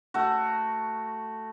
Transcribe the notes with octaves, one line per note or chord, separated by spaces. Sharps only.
A3 F#4